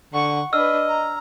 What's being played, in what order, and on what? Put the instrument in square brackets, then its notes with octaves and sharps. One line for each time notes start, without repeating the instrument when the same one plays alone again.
[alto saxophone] D3 [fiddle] F#5 C#6
[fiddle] D4 B4 [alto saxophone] D#5 [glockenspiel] E6 F6
[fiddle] A#5